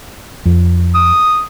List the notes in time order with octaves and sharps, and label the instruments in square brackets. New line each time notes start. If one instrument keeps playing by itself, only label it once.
[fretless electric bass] F2
[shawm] D#6